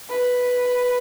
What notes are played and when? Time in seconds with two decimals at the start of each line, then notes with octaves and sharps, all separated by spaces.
0.09 B4